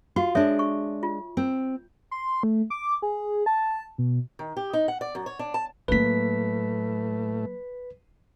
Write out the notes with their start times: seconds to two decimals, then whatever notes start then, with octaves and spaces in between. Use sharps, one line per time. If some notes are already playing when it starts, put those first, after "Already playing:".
0.16 F4 F#4
0.35 G#3 D4 A4 C#5 E5
0.59 C#6
1.03 F4
1.37 C4
2.11 C6
2.43 A3
2.70 D6
3.02 G#4
3.46 A5
3.98 B2
4.39 D#3
4.57 G4
4.73 D#4
4.88 F#5
5.01 D5
5.15 F#2
5.26 C#5
5.39 D4
5.54 A5
5.88 A2 F#3 A3 A#3 B4 B6